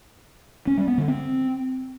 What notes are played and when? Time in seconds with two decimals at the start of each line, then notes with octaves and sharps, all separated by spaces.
0.67 C#4
0.77 G3
0.88 B3
0.98 D3
1.08 C4